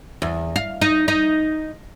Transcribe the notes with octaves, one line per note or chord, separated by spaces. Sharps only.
E2
F5
D#4
D#4